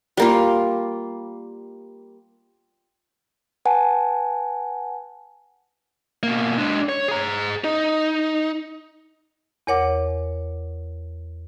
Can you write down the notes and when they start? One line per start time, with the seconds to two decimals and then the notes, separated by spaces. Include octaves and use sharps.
0.17 G3 A#3 F4
3.65 B4 F#5 G#5 A5
6.23 B2 A#3
6.58 G#3 D4
6.89 C#5
7.08 G#4 A#5
7.64 D#4
9.67 E2 A#4 C#5 F#5 D6